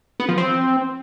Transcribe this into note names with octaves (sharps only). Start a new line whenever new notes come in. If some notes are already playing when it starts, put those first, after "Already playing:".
B3
F3
C4